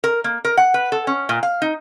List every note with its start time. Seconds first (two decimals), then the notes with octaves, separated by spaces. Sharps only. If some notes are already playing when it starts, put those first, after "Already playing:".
0.04 A#4
0.24 A#3
0.45 A#4
0.57 F#5
0.74 B4
0.92 A4
1.07 C#4
1.29 A#2
1.43 F5
1.62 D#4